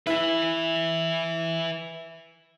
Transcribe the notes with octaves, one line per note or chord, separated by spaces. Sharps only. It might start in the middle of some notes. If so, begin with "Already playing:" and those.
E4 B4 E5